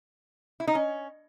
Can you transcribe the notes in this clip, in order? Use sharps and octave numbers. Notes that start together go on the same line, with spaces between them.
E4
D#4
C#4